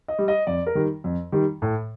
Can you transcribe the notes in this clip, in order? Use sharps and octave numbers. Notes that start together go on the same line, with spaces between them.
D#5
G3
D#5
F2 D5
A#4
D#3 G3
F2
D#3 G3
A2